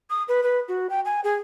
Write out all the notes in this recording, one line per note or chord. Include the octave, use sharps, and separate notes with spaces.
D#6
B4
B4
F#4
G5
G#5
G#4